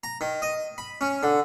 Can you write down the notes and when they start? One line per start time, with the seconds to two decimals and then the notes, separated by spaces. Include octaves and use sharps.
0.03 A#5
0.21 D#3
0.42 D#5
0.78 B5
1.01 C#4
1.23 D3